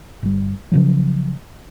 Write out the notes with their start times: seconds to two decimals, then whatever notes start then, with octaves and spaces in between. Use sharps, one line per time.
0.23 G1 G3
0.72 C#3 F3 F#3